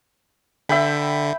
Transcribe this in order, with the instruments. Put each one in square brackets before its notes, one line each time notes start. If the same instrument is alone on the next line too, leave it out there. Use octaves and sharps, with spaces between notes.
[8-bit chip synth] D3 [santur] E5 G5 B5